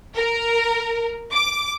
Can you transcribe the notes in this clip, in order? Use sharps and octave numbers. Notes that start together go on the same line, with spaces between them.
A#4
D6